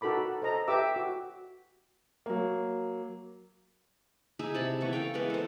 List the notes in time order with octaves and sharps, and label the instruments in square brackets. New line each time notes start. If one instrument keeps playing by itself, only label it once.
[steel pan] D#4 F#4 A4 A#4 B5 D6
A4 C5 D#5 A#5
G4 B4 E5 D6 E6
F#4
[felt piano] F#3 A#3
[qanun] D#4 E4 G#4 E5
C3 A5 B5
C#3 E3 B3 C#6
A4 A#4 F5 G5
E3 G#3 B3 A#4
A4 C5